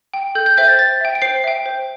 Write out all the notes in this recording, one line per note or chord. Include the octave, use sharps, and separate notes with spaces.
G5
A4 G6
G6
C5 E5 G5 G6
A6
C5 A6
E5 G5
D7
C5 C7
E5 G5
C5